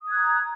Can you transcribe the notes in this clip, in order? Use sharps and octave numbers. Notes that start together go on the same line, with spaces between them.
A#5 D#6 F#6 G#6